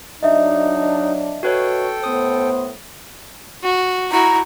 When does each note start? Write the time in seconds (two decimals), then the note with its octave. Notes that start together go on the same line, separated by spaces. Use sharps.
0.23 F#3 D4 D#4 D#5 E5
1.43 F#4 A4 B4 C#5 G5
2.04 A2 B3 C5 D#6
3.63 F#4
4.12 E4 F#4 A#5